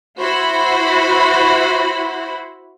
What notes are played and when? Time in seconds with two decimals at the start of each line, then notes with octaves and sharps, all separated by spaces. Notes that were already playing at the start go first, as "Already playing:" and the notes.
0.19 E4 F#4 C5 B5